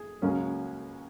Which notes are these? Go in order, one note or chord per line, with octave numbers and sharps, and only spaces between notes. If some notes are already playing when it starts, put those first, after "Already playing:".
Already playing: G#4
C#2 C#3 F#3 A#3 C#4